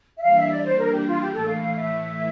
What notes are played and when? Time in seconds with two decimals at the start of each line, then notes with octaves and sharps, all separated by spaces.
0.17 E5
0.23 E3 G3 A#3 D4 F5
0.37 E5
0.51 D5
0.64 C5
0.78 A#4
0.92 G4
1.07 F4
1.20 G4
1.34 A2 E3 A3 A4
1.48 F5
1.62 F5
1.75 E5